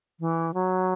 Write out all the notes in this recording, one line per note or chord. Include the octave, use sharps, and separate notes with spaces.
E3
F#3